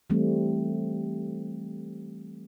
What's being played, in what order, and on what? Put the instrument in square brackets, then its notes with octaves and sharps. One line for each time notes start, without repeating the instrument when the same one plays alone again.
[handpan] E3 G3 A3 C4